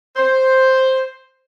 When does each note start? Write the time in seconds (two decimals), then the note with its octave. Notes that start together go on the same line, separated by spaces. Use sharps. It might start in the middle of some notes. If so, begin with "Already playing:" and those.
0.17 C5